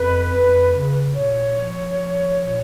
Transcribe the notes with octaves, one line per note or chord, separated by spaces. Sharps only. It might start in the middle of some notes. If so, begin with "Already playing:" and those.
Already playing: F2 B4
F2
C#3
A#2 C#5
F3
F3
A#2